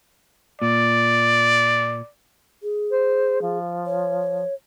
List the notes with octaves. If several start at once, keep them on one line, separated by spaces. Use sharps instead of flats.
A#2 D5
G#4
C5
F3
C#5